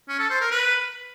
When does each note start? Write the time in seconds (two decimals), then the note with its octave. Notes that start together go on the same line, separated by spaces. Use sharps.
0.09 C#4
0.19 A4
0.30 C5
0.41 A#4
0.51 B4